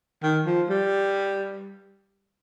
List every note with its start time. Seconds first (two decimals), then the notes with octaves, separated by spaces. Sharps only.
0.23 D#3
0.46 F3
0.69 G3